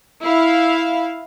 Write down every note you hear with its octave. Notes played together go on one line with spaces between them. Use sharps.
E4 F5